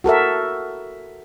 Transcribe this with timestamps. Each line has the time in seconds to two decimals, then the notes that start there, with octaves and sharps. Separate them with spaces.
0.04 F#4 A4 A#4 E5